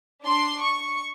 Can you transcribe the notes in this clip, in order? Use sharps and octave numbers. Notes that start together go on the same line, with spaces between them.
D4 C6
C#6